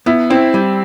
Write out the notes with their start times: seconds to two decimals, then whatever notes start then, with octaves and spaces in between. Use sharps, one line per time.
0.06 B3 E4
0.30 C4 E4
0.54 G3